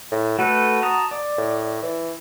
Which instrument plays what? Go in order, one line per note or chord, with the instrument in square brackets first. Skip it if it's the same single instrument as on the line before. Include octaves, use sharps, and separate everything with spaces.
[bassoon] A2
[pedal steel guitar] A3 A4 B4 [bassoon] F#4
[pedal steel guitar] A5 A#5 D#6
D5
[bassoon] A2
E3